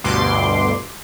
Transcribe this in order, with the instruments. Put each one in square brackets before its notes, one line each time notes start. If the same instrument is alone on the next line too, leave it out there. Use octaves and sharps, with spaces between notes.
[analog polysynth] G1 D2 G2 B2 C6 D6